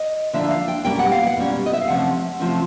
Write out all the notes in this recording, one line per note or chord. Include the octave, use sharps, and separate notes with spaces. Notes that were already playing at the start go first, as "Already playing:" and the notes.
Already playing: D#5
D3 F3 A#3 D4 E5
F5
G5
B2 G3 A#3 C#4 G5
F#5
F5
F#5
B2 G3 A#3 C#4
D#5
E5
F5
C3 F3 A3 C#4 F#5
C3 F3 A3 C#4